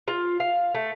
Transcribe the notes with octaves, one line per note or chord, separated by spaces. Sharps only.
F4
F5
A3